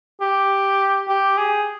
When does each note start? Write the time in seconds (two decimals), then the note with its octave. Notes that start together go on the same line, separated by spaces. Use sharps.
0.21 G4
1.09 G4
1.38 G#4